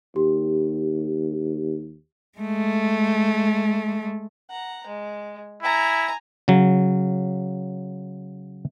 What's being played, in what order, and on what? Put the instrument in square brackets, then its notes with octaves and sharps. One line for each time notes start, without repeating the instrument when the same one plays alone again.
[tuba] D#2 [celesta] G4
[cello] G#3 A3
[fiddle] F#5 A#5
G#3
[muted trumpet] E4 [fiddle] G#5 A#5
[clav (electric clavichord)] C#3 F#3